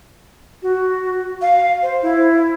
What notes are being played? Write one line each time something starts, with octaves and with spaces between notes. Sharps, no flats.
F#4
F5
C5
E4